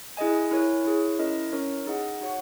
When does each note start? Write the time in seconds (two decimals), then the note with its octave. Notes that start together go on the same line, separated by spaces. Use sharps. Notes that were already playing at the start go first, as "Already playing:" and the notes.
0.17 E4 G#4 D#5 G#5
0.51 E4 A#4 C#5 G#5
0.85 E4 G#4 C#5
1.19 C#4 E4 A#4 D#5
1.52 C#4 E4 A#4 C#5
1.86 D#4 G#4 D#5 F#5
2.20 D#4 F#4 C#5 F#5